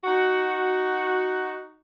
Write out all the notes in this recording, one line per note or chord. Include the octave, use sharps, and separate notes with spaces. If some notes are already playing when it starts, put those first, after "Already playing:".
D#4 F#4